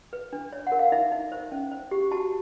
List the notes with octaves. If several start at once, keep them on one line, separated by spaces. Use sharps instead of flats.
B4
D4
C#5
F#5
A#4
F5
D#4 E5
D#4
C5
C#4
C5
G4
F#4 A5